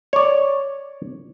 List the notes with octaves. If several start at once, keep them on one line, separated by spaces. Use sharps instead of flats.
C#5 D5